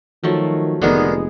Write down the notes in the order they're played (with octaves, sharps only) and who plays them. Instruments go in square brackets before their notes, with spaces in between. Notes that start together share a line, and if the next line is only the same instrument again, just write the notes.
[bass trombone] D#3 [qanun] F3 F#3 A3
[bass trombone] F1 [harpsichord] D3 D#3 [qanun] G#3 B3 G#4